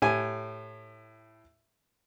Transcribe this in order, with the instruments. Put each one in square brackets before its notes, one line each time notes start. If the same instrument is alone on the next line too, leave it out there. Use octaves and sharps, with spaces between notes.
[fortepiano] A2 G4 G#5